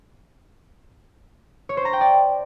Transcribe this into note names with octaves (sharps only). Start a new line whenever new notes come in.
C#5
C5
A#5
G5
D5